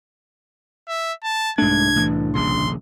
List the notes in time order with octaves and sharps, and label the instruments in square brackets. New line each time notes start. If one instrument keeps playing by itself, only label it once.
[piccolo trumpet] E5
A5
[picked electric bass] C2 D4 [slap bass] G#2 A3 [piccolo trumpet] G#6
[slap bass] A2 E3
[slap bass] D#1 A#1 C#3 [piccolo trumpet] C6